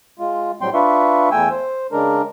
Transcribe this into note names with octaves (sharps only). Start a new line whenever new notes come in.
G#3 F4
A2 F#3 G3 C4 G5 C6
D4 F4 B4 E5 C#6
E2 A3 G5 G#5 E6
C5
C#3 G#3 D4 A#4